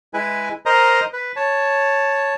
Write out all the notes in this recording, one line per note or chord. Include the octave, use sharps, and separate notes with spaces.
G#3 E4 B4 G#5
A#4 C5 D#5 A#5
B4
C#5 A5